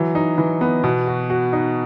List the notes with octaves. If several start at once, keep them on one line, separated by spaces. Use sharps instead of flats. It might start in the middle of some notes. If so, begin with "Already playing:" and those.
Already playing: E3 F#3
D#4
E3
B3
B2
F#4
F#4
D#4